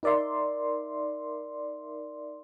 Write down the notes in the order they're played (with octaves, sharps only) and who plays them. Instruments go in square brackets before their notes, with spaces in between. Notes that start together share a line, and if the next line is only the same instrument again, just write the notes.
[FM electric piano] D#4 A#4 D5 E5 C6